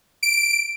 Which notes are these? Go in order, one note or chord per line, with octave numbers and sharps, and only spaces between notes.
D7